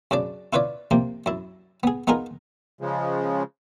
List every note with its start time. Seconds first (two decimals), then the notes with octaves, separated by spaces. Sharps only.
0.11 F#2 C#3 D4 D5
0.53 E4 F4 B4 C#5 D5
0.91 C3 F3 A#3
1.26 F#2 E4
1.83 B3 G#4
2.07 B3 D#4 F4 G#4 A#4
2.81 C#3 F3 G#3